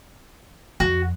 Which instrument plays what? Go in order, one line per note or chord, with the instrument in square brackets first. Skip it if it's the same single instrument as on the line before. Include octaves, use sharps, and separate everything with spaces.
[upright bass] F2 [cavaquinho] F#4